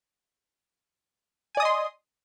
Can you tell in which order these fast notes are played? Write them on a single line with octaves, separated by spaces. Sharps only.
G#5 D5 D#6 D#5 C6